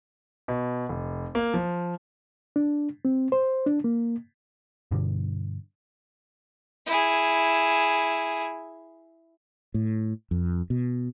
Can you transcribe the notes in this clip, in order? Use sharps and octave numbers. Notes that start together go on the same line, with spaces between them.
B2
F1
A#3
F3
D4
C4
C5
D4
A#3
G2 B2 D3 G3
E4 G#4
A2
F2
B2